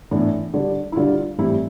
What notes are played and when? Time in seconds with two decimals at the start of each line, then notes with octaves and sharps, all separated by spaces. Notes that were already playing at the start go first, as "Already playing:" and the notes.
0.11 A2 E3 B3 D4
0.54 D3 G3 D4
0.92 E4
0.96 D3 G3 D4 F4
1.38 A2 E3 G3 C4 E4